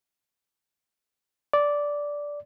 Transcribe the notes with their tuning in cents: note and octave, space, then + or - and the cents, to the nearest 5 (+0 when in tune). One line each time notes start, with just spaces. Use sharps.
D5 -10